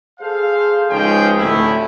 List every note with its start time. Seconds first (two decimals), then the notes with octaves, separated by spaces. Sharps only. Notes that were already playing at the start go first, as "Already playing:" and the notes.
0.20 G#4 A4 C5 F5
0.90 C#2 F3 C#4 D#4 G#4 G5
1.39 D2 A2 C3 A3 C#4 E4